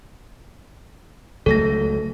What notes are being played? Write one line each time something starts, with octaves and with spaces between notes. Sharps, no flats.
C#2 F#3 A3 A4 A#6